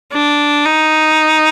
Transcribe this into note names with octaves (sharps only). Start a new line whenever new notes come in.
D4
D#4